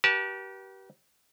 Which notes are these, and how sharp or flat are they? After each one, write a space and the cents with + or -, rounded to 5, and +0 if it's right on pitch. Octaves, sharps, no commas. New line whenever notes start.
G4 -30 B4 -45 A5 -25